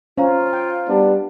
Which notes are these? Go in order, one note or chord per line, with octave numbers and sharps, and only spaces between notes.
C#4 F4 C5 F5 A#5
G5
G3 B3 D4